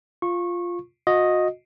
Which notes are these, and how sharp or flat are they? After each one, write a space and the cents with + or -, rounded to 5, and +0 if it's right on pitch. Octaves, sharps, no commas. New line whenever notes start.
F4 +0 C#6 -20
F#4 -35 D#5 +0